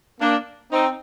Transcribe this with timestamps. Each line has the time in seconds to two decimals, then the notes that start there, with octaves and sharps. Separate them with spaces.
0.20 A#3 D4
0.71 C4 D#4